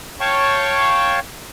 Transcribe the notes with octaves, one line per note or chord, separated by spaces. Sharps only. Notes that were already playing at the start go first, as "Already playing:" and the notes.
C#5 F5 G5 A5 C#6